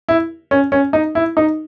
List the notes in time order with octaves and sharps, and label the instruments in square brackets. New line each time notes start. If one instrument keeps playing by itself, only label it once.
[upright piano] E4
C#4
C#4
D#4
E4
D#4